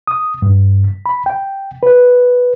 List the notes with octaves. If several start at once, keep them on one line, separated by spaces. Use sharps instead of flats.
D#6
G2
B5
G5
B4